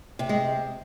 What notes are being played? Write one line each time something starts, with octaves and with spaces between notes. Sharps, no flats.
C3
G#3